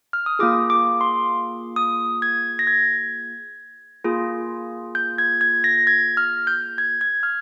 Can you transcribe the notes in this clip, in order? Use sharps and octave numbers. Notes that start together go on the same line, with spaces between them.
F6
D#6
A#3 F4 G#4 D6
D6
C6
D#6
G#6
A#6
G#6
A#3 F4 G#4
G6
G#6
G#6
A#6
G#6
F6
G6
G#6
G#6
F6